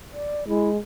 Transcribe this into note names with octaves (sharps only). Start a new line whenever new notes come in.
D5
G#3 E4